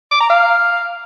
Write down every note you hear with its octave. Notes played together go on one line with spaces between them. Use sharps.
D6
A#5
F5